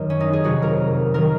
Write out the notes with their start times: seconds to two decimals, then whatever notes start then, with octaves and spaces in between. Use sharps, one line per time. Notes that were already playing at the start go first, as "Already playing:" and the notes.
Already playing: F#2 D#3 F#3
0.10 C#4
0.20 D#4
0.33 G#4
0.44 F2 C3 F#3 F#4
0.62 A#4
1.14 D#3 F#3 A#4